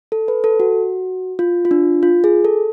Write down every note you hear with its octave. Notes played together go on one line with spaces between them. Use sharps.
A4
B4
A4
F#4
F4
F4
D4
F4
G#4
A4